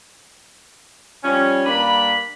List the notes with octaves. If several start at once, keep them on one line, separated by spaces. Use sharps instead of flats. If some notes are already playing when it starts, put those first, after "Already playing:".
F3 G3 C#4
G2 A#3 D4 B5